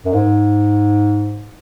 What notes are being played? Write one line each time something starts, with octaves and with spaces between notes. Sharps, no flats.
F#2
G#2